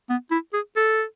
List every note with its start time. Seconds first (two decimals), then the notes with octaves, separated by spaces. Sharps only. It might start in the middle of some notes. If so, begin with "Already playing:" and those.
0.09 B3
0.31 E4
0.53 G#4
0.76 A4